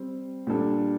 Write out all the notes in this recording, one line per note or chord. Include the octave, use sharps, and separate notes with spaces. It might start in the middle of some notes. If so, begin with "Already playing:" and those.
Already playing: G3 C4
A#2 G3 D4 A4